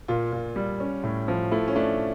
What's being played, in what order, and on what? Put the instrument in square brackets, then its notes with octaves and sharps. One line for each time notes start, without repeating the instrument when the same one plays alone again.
[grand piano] A#2 [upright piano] F4
[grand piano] A#2
G3
C#4
A2
F3
[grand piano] A3 [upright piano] E4
[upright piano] C#4
[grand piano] A3 [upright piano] D4